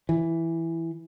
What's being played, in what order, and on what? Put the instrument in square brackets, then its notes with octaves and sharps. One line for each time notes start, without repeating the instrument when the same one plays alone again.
[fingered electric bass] E3